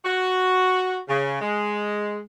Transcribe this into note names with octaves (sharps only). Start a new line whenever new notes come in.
F#4
C#3
G#3